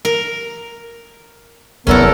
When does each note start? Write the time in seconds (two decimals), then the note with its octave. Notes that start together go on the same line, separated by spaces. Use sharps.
0.05 A#4
1.87 F1 E2 F#3 B3 C#4 E4 A4 A#4